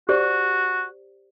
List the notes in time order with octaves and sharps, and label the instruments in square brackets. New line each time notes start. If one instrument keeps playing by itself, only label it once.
[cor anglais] F#4 [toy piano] G4 C5 D5